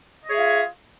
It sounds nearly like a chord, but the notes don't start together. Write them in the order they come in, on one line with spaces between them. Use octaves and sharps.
D#5 C#5 G#4 E5 F4